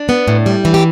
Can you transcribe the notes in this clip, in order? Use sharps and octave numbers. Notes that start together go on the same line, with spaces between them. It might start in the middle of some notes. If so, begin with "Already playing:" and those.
Already playing: D4
B3
A2
G3
E3
G4